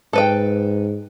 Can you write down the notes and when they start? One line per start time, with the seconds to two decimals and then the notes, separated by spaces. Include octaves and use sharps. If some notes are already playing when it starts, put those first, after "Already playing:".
0.13 G#2 A4 B4 G5